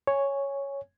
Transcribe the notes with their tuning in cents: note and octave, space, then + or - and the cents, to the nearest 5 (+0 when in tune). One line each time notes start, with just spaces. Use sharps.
C#5 +0 G#5 -5